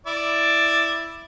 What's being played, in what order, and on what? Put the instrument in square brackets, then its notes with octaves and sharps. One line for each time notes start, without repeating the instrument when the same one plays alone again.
[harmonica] E4 D5